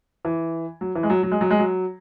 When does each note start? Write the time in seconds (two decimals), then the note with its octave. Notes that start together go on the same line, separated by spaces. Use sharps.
0.25 E3
0.81 F#3
0.95 E3
1.03 G#3
1.10 F#3
1.23 F#3
1.31 G#3
1.41 F#3
1.50 G#3
1.59 F#3